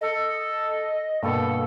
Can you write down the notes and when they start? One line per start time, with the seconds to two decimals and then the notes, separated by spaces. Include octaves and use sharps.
0.01 A4 D#5
1.23 G2 B2 A#3 A4